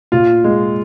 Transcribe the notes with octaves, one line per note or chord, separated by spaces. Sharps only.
A#2 F4
G#3